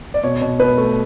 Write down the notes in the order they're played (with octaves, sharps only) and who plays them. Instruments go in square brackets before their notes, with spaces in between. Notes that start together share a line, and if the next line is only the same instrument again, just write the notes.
[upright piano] D5
[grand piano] B2 [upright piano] C#5
[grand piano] B2
[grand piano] B2 [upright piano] B4
[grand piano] A3